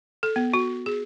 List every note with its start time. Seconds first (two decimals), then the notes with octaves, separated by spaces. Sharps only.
0.23 A4
0.36 B3
0.54 F#4
0.86 G#4